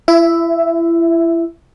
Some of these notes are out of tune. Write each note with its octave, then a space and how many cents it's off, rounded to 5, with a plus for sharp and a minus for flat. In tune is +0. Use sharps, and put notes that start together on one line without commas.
E4 +30 E5 +0